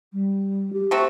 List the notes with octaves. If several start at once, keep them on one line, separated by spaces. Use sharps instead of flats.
G3
G4
A3 C4 F#4